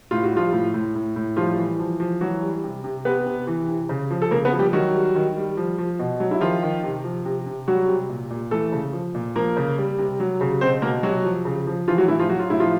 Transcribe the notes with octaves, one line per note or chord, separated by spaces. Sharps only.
A2 F4
F#4
F3 G3 F4
A2
A2
A2
A2
F3 G3 F4
E3
F3
F3
E3 F#3 F#4
G3
C3
C3
C3 B3 B4
C3
E3
C3
C#3
F3
A4
C#3 A#3 A#4
B3 B4
F3
G3 G4
D#3 F#3 F#4
G3
D#3
G3
F3
F3
B2
F#3
E4
D#3 F3 F4
D#3
C3
F3
C3
C3
F#3 G3 F#4
C3
A#2
A#2
E3 A3 A4
C#3
F3
A#2
F3 A#3 A#4
C#3
G3
C3
F#3
C#3
B2 C4 C5
B2 A#3 A#4
C3 F#3 F#4
F3
C#3
F3
E3 F3 F4
F#3 F#4
A2 E3 E4
F3 F4
F#3 F#4
F4
A2 E4
F3 F4